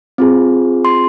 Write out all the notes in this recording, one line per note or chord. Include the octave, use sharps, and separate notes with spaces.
C4 F4 G#4
C6